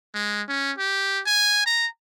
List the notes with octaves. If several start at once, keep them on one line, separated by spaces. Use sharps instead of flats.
G#3
C#4
G4
G#5
A#5